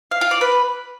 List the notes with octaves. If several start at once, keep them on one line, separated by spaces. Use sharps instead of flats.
F5
F4
D5
B4